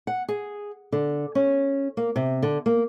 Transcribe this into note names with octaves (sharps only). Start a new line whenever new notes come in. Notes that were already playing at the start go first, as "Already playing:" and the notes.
F#5
G#4
D3
C#4
A#3
C3
D3
A#3